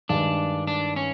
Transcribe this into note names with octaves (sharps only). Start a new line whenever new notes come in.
G2 D#3 G#3 D4
D4
C#4